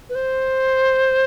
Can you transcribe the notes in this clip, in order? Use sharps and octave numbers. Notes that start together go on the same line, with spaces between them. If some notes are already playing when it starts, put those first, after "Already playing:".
B4
C5